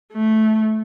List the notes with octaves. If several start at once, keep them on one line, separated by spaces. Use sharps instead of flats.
A3